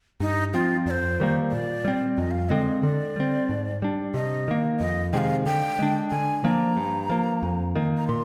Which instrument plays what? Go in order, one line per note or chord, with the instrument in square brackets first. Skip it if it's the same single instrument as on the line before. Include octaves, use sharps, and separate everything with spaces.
[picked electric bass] G2 [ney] D#4
[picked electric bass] F3 C4 [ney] F4
[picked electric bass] F2 [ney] D5
[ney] C5
[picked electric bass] D#3 G3 A#3
[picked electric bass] A#2 [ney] D5
[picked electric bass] G3 C4
[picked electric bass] F2 [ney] D#5
[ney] F5
F5
[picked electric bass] D3 G#3 C4 [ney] D#5
[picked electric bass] D3 [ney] D5
[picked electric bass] G3 C4
G#2
G3 D4
[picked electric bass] C3 [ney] D#5
[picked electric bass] D#3 A#3
[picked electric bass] F2 [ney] D#5
[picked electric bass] C3 D#3 G#3 [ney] F5 G5
[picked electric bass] D3 [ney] G5
[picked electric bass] G#3 D4
[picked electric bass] D3 [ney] G#5
[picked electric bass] F3 A#3 D4 [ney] A#5
[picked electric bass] G2
F3 A#3
F2
D#3 A#3
[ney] A#5
[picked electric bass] A#2 [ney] C6